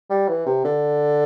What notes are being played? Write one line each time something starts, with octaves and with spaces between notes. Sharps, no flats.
G3
E3
C3
D3